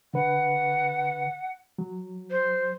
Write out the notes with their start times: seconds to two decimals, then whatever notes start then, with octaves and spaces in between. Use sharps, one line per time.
0.14 D3 B4 F#5
1.79 F#3
2.30 C5